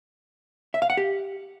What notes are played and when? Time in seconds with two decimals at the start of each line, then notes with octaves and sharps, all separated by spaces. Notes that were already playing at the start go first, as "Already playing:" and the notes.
0.74 E5
0.82 F5
0.90 F#5
0.97 G4